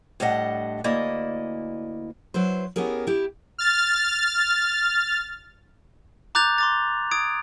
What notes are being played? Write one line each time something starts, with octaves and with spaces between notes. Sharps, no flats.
A2 G3 D4 D#5 F#5
D2 A#3 E4 D5 D#5
F#3 E4 B4 C5
B3 C#4 E4 G4 G#4 A#4
E4 G4 E5
F6 A6
A#5 D6 F#6 G6 A6 F7
C6 D6 A6
D#6 G#6 D7